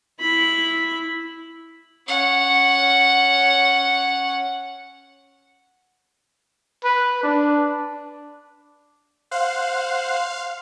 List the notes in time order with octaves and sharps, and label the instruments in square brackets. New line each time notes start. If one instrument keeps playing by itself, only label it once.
[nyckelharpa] E4 B5
[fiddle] C#4 F#5
[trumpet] B4
D4
[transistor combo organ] C5 F#5 [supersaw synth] F5